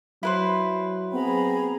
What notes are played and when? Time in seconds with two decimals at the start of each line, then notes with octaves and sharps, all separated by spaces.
0.23 F#3 E4 B4 C5
1.13 B3 C4 G#4 A#5 B5